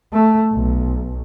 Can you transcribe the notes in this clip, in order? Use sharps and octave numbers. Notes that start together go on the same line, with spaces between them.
A3
B1